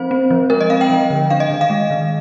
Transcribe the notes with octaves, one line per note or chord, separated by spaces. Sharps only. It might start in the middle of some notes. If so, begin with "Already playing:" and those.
Already playing: F3 C4 C5
C4
F3
G#3 A#4
D#5
C4 F5
G5
F3
D3
D4 F5
D#5
D#3
F5
G#3
D#3